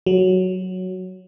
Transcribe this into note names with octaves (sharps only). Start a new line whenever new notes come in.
F#3